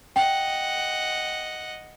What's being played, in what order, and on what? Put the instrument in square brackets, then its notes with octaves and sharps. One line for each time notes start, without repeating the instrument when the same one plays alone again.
[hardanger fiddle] D#5 F#5 [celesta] G5